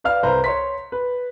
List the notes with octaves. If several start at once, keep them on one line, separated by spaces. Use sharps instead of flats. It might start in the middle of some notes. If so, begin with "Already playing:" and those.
B4 D5 F5 F6
C2 B4 C5 A#5
C#5 C6 B6
B4